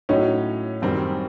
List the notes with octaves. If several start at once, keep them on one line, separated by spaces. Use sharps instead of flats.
A2 F#3 C#4 D#4
F#2 D#3 G3 C4